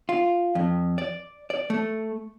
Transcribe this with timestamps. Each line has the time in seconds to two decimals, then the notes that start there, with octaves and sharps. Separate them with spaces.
0.09 F4
0.55 F2
0.98 D5
1.50 D5
1.70 A3